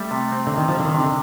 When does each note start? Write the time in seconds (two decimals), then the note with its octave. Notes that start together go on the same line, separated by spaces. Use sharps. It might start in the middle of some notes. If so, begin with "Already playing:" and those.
Already playing: G3 A3
0.11 C3
0.32 C4
0.47 D3
0.54 C3 D#3
0.68 F3
0.74 G3
0.80 D3
0.85 D#3
0.95 C3
1.00 D3